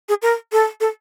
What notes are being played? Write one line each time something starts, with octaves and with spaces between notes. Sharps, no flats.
G#4
A#4
A4
A4